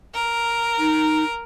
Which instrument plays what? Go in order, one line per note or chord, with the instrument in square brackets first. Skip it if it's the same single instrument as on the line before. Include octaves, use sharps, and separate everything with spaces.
[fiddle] A#4
[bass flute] D#4